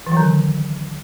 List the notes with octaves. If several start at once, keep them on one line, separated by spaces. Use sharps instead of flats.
E3
F#3
D#3
D3